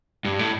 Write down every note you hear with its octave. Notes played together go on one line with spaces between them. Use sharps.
G2
A2